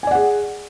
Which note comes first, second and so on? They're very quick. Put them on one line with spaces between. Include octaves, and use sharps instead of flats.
G#5 D5 F#5 G#4